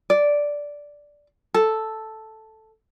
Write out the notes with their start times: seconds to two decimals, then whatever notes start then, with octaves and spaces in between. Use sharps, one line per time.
0.10 D5
1.54 A4